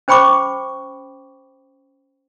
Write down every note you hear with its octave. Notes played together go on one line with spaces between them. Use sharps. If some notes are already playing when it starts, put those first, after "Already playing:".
C#4 C5 G5 B5 C#6 D6